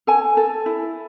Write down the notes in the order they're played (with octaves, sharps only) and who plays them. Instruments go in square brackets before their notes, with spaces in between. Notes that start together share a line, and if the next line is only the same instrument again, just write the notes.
[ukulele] A4 G#5
A4
E4